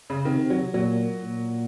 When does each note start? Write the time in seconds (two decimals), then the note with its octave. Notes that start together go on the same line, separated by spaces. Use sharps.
0.10 C#3
0.25 C3 D#3
0.50 F#3
0.73 A#2 F#3
1.22 A#2